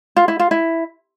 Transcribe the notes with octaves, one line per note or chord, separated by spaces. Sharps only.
F4
E4
F4
E4